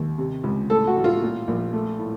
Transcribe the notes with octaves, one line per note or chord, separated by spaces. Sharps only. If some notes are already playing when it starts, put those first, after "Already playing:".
Already playing: D#2
C3
C#2
A2 A4
F#4
A1
F4
A#2
A#1
A3
A2